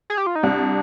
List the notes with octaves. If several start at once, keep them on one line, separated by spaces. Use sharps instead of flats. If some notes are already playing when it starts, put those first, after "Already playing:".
G#4
G4
F4
D#4
C2 D4